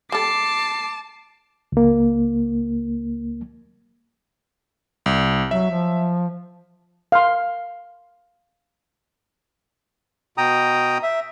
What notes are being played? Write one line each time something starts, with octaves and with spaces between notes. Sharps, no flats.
G3 A4 A5 D6 C7
C#2 A#3
C2
F#3 E5
F3
F5 C6
B2 G5 A#5 D#6
E5